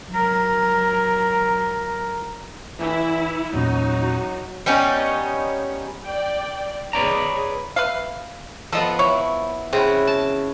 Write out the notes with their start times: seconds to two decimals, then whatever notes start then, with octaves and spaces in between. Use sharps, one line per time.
0.10 F#3 A#4
2.80 E3 E4
3.54 E2 A#2 F#3 C#4 D#4 F#4
4.66 G3 B3 C#4 D#4
6.04 D5 G5
6.93 D#4 G#4 B4 C#5 D5 A#5
7.76 B4 E5 F5
8.73 F3 B3 A4 D#5
8.99 E4 C#5
9.73 C#3 C4 E4 F#4
10.07 A5